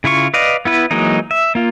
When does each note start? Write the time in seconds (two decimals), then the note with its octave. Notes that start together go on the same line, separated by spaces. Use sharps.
0.04 C#3 E4 F4 C#6
0.34 B4 D5 D#5 F5
0.65 B3 E4 B4
0.91 E3 F#3 G#3 A#3 D#4
1.31 E5
1.55 A#3 F4